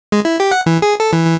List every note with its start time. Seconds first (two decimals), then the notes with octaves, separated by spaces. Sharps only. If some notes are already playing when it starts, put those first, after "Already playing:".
0.12 G#3
0.25 E4
0.40 G4
0.51 F#5
0.66 E3
0.82 G#4
1.00 A4
1.13 E3
1.26 E3